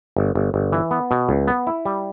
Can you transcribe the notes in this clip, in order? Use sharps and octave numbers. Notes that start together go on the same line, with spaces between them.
G1
G1
G1
E3
B3
B2
C#2
B3
E4
G3